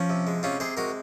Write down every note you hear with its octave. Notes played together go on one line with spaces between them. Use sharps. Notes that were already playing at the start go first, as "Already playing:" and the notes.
Already playing: F3 C#4
C3
G#3
C3 C#4 F4
C3 G#4 C5
G#3 F#4 A#4